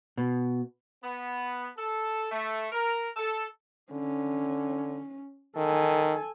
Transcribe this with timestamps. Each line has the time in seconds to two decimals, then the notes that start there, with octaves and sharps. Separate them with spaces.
0.17 B2
1.03 B3
1.77 A4
2.32 A3
2.73 A#4
3.17 A4
3.92 D3 C#4
5.57 D#3 A4 G#5